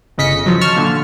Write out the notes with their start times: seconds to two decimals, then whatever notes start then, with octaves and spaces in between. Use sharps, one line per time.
0.18 G1 C#3 D#5 B6 C#7
0.46 F3 F#3
0.61 A5 C#6 F6
0.77 A#2 D3